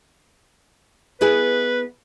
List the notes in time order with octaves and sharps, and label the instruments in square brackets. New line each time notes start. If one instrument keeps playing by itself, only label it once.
[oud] B3 E4 G#4 [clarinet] B4